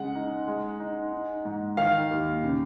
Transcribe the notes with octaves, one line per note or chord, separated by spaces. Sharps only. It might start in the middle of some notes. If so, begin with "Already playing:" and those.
Already playing: C#3 G#3 F#5
D#4
G#3
D#4
D#4
G#2
D#3 F5
D#2
C#3